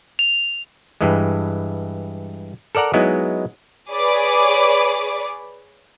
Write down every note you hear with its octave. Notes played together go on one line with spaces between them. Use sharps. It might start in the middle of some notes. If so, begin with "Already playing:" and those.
F7
G2 E3 G#3
A4 A#4 D5 F#5 A#5
F#3 G#3 B3 D#4 E4
G#4 B4 C#5 D5 D6